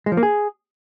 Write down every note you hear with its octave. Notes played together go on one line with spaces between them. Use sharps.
G#3
F3
A#3
G#4